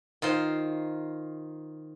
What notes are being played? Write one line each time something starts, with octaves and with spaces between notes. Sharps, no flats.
D#3 F4 C5